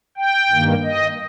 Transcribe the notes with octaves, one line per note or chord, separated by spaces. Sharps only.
G5
G2 D#3 A#3
D#5